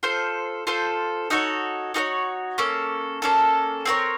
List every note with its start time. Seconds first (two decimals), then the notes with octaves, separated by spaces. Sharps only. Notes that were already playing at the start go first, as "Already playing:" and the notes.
0.03 F4 A4 C5
0.67 F4 A4 C5
1.30 D#4 F#4 A4 C#5
1.94 D#4 F#4 A4 C#5
2.58 A#3 C#4 A4
3.22 A#3 C#4 A4
3.85 C4 F#4 A#4 C#5